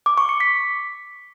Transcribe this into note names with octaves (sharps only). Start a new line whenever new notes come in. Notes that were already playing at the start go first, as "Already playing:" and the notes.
D6
C#6
C#7
B6